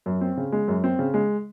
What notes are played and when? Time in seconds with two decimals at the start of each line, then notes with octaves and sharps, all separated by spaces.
0.06 F#2
0.21 C4
0.37 C#3
0.52 G#3
0.68 F#2
0.84 C4
0.99 C#3
1.14 G#3